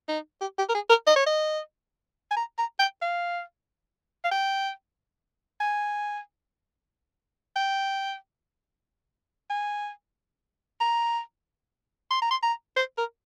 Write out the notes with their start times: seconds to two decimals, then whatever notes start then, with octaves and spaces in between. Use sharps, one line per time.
0.09 D#4
0.41 G4
0.58 G4
0.69 A#4
0.74 G#4
0.90 A#4
1.07 D#5
1.16 C#5
1.26 D#5
2.31 G#5
2.37 A#5
2.58 A#5
2.79 G5
3.02 F5
4.24 F5
4.31 G5
5.60 G#5
7.56 G5
9.50 G#5
10.80 A#5
12.11 C6
12.22 A#5
12.31 C6
12.43 A#5
12.76 C5
12.97 A#4